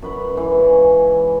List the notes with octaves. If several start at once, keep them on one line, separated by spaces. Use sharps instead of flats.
F#2 B4 B5
G#2 E3
C#3